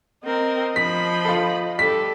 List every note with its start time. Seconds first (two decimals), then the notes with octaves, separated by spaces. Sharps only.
0.25 C4 A#4 D#5
0.76 F3 B5 B6
1.25 F4 A4
1.79 G3 A4 B6